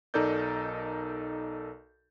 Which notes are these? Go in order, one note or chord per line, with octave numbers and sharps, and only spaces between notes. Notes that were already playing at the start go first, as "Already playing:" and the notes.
B1 D#4 A4 A#4 D5 G6